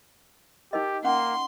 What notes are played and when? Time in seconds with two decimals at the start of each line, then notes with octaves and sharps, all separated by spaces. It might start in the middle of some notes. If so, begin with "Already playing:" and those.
0.73 D#4 G4 A#4 D#5
1.04 A#3 C#4 F#5 C6